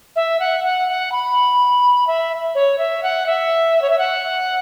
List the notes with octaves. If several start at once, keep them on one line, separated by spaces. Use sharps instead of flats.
E5
F#5
F#5
F#5
B5
E5
C#5
E5
F#5
E5
C#5
E5
F#5